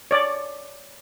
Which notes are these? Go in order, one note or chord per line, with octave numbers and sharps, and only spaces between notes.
C#5 D5